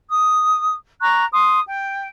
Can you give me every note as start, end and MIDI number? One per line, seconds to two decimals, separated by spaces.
0.09 0.75 87
1.01 1.25 82
1.01 1.25 85
1.01 1.25 90
1.32 1.59 84
1.32 1.59 87
1.65 2.07 79